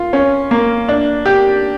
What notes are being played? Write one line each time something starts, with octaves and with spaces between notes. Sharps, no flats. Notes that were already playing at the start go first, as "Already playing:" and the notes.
Already playing: F4
C#4
A#3
D4
G4